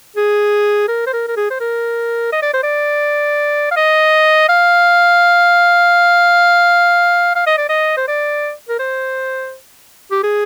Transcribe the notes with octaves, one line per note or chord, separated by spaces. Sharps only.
G#4
A#4
C5
A#4
A#4
G#4
C5
A#4
D#5
D5
C5
D5
F5
D#5
F5
F5
D#5
D5
D#5
C5
D5
A#4
C5
G4
G#4